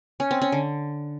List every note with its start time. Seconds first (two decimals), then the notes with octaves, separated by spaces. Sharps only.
0.20 C#4
0.31 C4
0.42 C#4
0.52 D3